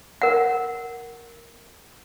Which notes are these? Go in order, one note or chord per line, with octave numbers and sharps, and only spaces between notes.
A#4 F#5